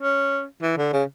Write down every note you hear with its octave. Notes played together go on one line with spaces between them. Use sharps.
C#4
E3
D3
C#3